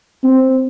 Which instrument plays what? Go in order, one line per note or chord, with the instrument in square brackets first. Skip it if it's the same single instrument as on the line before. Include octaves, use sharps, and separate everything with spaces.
[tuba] C4